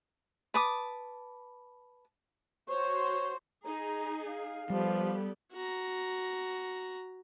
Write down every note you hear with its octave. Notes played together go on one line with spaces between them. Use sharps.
B4 A5 D6 D#6
F#4 C5 C#5
D#4 G#4 A#5
F5
F3 G3 B3 G4 A4
F#4 A#5